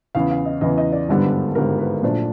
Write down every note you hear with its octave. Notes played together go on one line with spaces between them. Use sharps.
E2 C#3 E3 F5
F5
D#5
E2 C#3 E3 D#5
D#5
D5
G#1 G2 D3 G3 B3
G#1 G2 D3 G3 B3 A#4
B4
A#1 A#2 F#3 A3 D4 C5